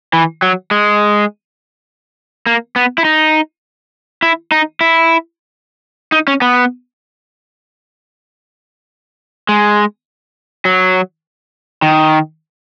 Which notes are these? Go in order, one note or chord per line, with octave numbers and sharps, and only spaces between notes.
E3
F#3
G#3
A#3
B3
E4
D#4
E4
D#4
E4
D#4
C#4
B3
G#3
F#3
D#3